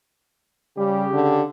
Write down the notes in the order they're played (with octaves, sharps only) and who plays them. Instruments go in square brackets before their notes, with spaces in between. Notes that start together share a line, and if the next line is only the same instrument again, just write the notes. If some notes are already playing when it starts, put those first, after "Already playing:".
[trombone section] C#3 G4 [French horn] G3
[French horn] D3